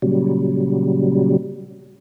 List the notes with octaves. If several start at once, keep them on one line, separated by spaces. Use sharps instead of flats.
A#2 C#3 F#3 G3